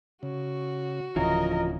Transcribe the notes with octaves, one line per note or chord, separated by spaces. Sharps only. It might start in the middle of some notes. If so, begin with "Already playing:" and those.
C#3 F#4
D1 C#3 E3 F3 F4 A#4 D#5